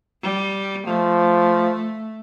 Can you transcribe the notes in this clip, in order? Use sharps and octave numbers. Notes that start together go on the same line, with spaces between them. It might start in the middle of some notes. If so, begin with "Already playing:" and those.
G3
F3 A3